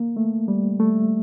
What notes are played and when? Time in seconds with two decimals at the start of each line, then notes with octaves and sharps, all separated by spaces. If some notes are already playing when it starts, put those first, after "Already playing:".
Already playing: A#3
0.16 A3
0.48 G3
0.79 A3